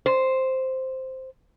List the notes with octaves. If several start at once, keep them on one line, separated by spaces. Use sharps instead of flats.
C5